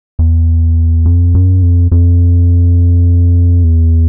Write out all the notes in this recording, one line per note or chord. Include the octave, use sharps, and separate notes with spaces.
E2
F2
F#2
F2
F2
E2